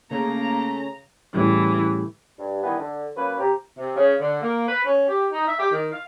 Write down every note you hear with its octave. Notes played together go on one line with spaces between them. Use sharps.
C#3 A3 A#3 A#5
A2 C#3 E3 G3
G2
G2 D#3 E3 B3 G5 G#5
D3
F#3 A#3 C#4 B4
C3 G4 A#5
C3
C#3
D3
A#3
B4
C#4
G4
D#4
E5
G4
D#3
F5